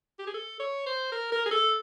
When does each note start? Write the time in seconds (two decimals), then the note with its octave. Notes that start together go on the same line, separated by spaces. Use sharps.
0.19 G4
0.27 G#4
0.34 A4
0.60 C#5
0.86 C5
1.12 A#4
1.32 A#4
1.46 G#4
1.51 A4